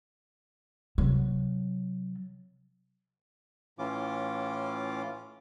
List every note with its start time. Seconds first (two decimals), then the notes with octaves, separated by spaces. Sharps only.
0.98 C3 F#3
3.79 A2 E3 C#4 F4 D6